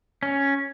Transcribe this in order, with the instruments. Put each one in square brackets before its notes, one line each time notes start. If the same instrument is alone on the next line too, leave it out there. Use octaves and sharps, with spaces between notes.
[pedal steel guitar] C#4